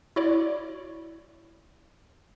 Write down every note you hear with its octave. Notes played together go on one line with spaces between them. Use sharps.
E4 F#4 C#5 D5